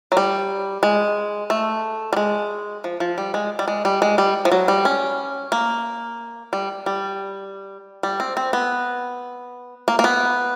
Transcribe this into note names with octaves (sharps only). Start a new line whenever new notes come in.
F#3
G3
G#3
A3
G3
G#3
F3
F3
G3
G#3
G3
G#3
G3
G#3
G3
F3
F#3
G3
C#4
A#3
G3
G3
G3
C4
C4
B3
A#3
A#3
B3